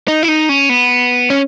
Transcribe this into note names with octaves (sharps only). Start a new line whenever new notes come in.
D#4
E4
D#4
C#4
B3
C#4